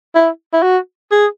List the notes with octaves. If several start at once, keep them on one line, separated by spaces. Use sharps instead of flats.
E4
E4
F#4
G#4